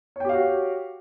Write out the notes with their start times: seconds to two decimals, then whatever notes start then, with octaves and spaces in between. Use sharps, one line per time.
0.16 C#5
0.20 G5
0.25 G4
0.29 F5
0.34 F#4